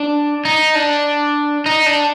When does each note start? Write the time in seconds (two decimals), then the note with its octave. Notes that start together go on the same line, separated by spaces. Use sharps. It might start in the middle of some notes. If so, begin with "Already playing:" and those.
Already playing: D4
0.45 D#4
0.75 D4
1.66 D#4
1.86 D4